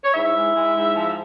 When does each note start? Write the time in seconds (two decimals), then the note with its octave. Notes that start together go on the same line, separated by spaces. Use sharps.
0.04 C#5
0.14 G#2 E4 E5
0.35 G#3
0.56 G#3
0.76 G#2
0.96 F3